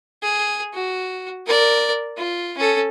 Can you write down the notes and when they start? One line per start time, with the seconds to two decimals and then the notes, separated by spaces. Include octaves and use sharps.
0.23 G#4
0.74 F#4
1.46 A#4 D5
2.17 F4
2.58 C#4 A4